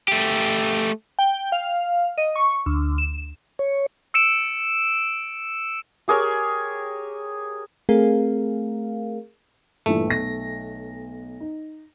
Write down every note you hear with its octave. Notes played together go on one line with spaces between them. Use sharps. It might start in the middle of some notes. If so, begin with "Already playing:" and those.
A3 G4
G5
F5
D#5
C#6
D2
E7
C#5
E6 C#7 D7 E7
G4 G#4 A#4 C#5
A3 C4 G#4 A#4 F5
G2 A#2 E3 A3
B1 A#6
D#4